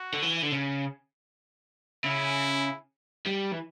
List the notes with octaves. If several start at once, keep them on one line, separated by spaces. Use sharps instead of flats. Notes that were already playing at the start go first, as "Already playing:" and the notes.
Already playing: F#4
D3
E3
D3
C#3
C#3 E4
G3
E3